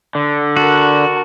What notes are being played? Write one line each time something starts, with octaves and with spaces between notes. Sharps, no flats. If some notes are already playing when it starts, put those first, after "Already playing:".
D3
F#4 A#4 A5